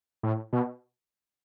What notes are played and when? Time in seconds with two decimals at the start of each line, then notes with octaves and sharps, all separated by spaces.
0.23 A2
0.53 B2